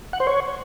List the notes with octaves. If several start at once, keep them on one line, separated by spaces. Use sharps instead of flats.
F#5
C5
C#5